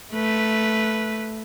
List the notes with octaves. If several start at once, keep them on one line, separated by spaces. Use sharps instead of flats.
A3 B4